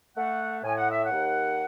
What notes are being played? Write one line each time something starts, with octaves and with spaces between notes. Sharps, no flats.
A3 F#5
A2 G#5
F#5
E5
F#5
D#2